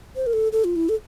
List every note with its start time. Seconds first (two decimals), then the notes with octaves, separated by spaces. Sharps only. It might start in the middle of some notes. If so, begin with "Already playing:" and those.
0.16 C5
0.26 A#4
0.33 A4
0.52 A4
0.64 F4
0.76 E4
0.89 A4